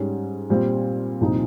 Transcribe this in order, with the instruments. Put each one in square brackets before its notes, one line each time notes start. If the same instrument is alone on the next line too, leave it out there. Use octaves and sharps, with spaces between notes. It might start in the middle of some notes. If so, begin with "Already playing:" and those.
Already playing: [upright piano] G#2 G3 C#4
A#2 G3 C4
C2 A#2 F3 C4 D#4